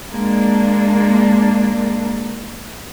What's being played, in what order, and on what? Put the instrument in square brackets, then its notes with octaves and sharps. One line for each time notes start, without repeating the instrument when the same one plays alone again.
[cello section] G#3 A#3 D4